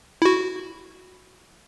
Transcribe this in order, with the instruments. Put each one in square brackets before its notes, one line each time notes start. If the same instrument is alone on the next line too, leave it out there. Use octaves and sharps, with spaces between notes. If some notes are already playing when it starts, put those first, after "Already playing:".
[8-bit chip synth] E4 F#4